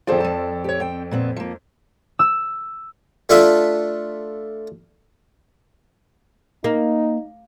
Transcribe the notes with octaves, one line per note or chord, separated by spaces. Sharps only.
F2 F4 G#4 A4 C5 D5
F3 A5
G4 C#5
C4 G5
A#2 B3 C4
F3 A#3
E6
A3 D4 F4 A4 E5
A#3 D#4